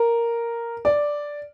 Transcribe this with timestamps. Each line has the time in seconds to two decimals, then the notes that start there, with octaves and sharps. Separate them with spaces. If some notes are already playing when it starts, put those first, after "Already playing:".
Already playing: A#4
0.85 D5